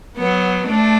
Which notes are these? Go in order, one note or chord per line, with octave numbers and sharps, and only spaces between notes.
F#3 B3
A3 D4